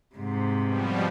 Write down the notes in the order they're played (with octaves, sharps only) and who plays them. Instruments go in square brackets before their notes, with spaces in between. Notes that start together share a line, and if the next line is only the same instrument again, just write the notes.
[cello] G#2 C3
[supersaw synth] B2 F3 G3